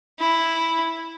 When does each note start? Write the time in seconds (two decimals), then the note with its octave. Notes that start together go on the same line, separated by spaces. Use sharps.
0.19 E4